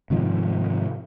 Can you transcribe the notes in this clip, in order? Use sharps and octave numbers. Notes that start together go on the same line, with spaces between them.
G#2 C3 D#3 F3